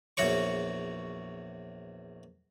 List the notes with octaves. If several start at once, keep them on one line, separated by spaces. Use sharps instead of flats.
A#1 E2 F#4 C#5 C#6